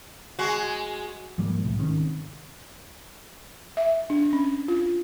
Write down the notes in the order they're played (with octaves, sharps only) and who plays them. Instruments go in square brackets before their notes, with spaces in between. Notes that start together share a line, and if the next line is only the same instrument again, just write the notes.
[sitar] G#3 F#4
[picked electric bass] G#2 F3 G3 A#3
C2 A2
G#1 C3 D#3 C#4
[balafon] E5
D4
C#4
F4